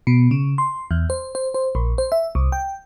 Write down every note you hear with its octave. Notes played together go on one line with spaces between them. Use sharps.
B2
C#3
C6
E2
C5
C5
C5
A#1
C5
E5
C2
G5